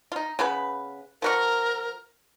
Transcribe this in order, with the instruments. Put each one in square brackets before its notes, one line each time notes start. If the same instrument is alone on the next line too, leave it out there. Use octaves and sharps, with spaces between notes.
[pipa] D#4 F4
C#3 B3 B4
[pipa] F3 F#4 C#6 [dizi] A#4